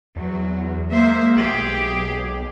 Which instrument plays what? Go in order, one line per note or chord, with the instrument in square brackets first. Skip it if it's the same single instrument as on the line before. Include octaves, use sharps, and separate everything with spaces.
[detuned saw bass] E2 [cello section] F#3
[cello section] G#3 C5 E5 [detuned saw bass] A#3
[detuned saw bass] B1 [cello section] G4 G#4